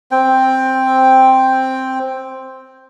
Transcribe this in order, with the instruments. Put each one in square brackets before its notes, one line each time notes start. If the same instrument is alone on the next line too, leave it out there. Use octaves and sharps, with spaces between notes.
[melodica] C4 G5